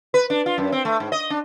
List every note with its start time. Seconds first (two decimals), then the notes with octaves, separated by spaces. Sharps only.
0.14 B4
0.30 D4
0.46 F4
0.58 F#2
0.72 C4
0.85 A3
1.00 G#2
1.12 D#5
1.30 D4